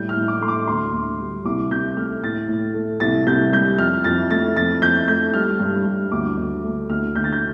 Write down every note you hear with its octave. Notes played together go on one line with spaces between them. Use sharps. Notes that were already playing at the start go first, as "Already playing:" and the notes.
Already playing: A2 G3 G6
F6
A2
D6
A3 C6
D6
D2 C6
D2
G3
C2 D6
C2 G6
A3 F6
A2 A6
A2
A3
C2 A6
C2 G6
G3 G6
F2 F6
F2 A6
A3 A6
F2 A6
F2 G6
A3 G6
G3 F6
G2
G2
D2 D6
D2
A3
D2 F6
D2 G6
A6
G6